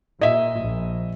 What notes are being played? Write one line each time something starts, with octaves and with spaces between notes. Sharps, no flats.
A#2 D#5 E5
A#1